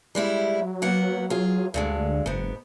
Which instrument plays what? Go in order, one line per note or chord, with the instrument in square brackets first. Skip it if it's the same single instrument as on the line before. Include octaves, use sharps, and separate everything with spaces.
[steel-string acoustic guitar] G3 G#3 E4
[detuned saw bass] F#3
[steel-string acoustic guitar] A#3 B3 F#5
F4 G#4
[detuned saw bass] D2 [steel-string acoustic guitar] G2 D3 G#3
[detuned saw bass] F#1 [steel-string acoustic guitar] G#2 B3